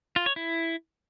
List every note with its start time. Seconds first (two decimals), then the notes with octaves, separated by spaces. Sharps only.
0.16 F4
0.26 C#5
0.36 E4